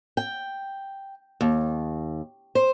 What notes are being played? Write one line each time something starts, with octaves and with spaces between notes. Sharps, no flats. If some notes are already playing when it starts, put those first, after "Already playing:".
G5
D#2
C5